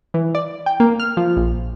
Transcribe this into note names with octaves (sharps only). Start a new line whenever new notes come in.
E3
D5
G5
A#3
F6
F3
A#1